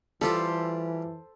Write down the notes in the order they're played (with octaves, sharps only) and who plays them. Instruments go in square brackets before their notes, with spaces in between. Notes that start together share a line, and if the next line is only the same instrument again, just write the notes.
[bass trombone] E3 [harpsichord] G3 F4 G4 [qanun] A4 C5